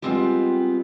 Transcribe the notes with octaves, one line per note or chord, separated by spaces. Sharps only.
G3 G#3 B3 C4 F4 G4